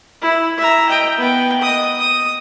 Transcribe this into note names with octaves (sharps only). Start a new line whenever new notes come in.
E4
E5 A#5
D#5 G5
B3 G5
D#5 D#6
D#6